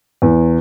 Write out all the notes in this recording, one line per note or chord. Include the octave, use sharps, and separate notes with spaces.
E2